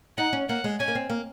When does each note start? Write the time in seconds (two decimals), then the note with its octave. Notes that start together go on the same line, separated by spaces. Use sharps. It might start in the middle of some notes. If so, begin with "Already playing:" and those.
0.18 D#4 F#5
0.33 C#4
0.49 A#3 F#5
0.64 G#3
0.80 C#4 G#5
0.88 A#3
0.95 C4
1.10 A#3